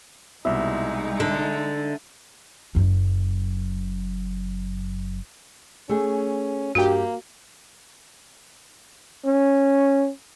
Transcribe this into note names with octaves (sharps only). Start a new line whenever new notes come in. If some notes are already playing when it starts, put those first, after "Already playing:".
C2 B2 G#3 D#4 E4 E5
D3
F#1 F#2
A3 C#4 G#4
G2 A#3 F#4 G4
C#4